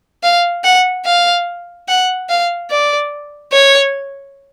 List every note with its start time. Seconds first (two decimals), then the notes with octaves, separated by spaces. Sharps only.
0.23 F5
0.64 F#5
1.05 F5
1.88 F#5
2.29 F5
2.70 D5
3.52 C#5